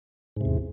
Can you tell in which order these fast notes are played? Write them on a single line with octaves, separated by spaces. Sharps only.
G#2 C3 E2